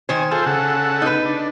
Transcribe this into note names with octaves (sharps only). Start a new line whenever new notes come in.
D#3 C5 G#5
F4 G#4 A4 C5
C#3 A4 F#5
D#4 B4
D4